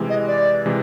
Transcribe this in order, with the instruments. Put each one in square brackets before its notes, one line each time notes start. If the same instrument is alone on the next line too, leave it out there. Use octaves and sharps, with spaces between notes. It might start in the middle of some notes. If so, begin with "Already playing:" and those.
Already playing: [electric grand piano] C3 E3 G#3
[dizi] D#5
D5
[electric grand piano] C3 E3 G#3